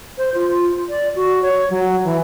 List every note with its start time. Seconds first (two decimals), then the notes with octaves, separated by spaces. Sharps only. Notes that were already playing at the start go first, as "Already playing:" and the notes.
0.18 C5
0.35 F4
0.89 D5
1.15 F#4
1.42 C#5
1.70 F#3
2.04 E3